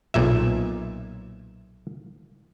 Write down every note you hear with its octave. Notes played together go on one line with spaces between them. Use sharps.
B1 A#2 E5